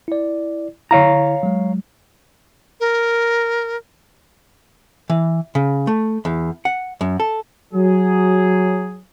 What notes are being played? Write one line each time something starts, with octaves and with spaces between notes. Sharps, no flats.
E4 D5
D3 E4 C#5 F5 A#5
F#3 G#3
A#4
E3
C#3
A3
E2
F#5
F#2
A4
F#3 G#4